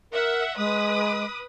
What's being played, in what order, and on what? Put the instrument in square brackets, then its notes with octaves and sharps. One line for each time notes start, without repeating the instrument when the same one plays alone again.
[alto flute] A#4 [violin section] E5 F#5
[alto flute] G#3 [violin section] B4 D#6